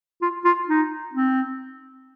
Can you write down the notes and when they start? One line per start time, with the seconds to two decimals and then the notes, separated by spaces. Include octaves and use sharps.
0.22 F4
0.45 F4
0.68 D#4
1.14 C4